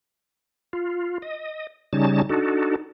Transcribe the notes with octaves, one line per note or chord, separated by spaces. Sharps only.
F4
D#5
C#3 G3 C#4 D#4 A5
D4 D#4 F#4 A4